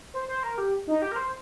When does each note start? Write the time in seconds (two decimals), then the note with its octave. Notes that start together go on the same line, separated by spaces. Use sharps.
0.14 C5
0.28 C5
0.43 A#4
0.58 G4
0.87 D#4
1.02 G4
1.11 A#4
1.16 C5